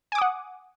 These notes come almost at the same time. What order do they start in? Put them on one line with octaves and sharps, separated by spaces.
G#5 D6 D#6 F#5